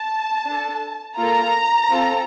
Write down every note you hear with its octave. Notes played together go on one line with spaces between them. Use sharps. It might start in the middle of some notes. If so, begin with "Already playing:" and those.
Already playing: A5
D4 A4
A#3 F4 A4 A#5
C4 F4 A4